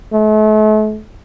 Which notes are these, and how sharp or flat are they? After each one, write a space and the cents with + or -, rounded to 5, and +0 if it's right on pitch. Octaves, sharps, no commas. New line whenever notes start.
A3 -40